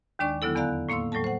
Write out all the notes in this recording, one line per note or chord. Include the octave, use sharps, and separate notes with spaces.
D#2 D#3 G#3 D4 D5 C#6
D3 F#3 B3 E4 A4
E2 B3 D5 F5 A#5 F#6
A2 A#3 F5 C6 E6
A2 F#3 G3 A4 A5
C5 F#5